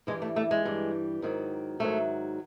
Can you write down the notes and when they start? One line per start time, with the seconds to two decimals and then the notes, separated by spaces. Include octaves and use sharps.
0.07 G2 E3 G3 G#3
0.22 A3
0.36 A3
0.51 G#3
0.65 G2 E3 G3
1.22 G#2 D#3 F#3
1.80 G#2 D#3 F#3 A3